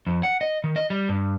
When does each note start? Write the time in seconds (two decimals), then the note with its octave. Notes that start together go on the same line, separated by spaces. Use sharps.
0.07 F2
0.23 F#5
0.41 D#5
0.64 D#3
0.76 D#5
0.90 G3
1.09 G2